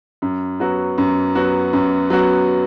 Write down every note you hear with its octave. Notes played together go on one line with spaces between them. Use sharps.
F#2
F#3 B3 F#4
F#2
F#3 B3 F#4
F#2
F#3 B3 F#4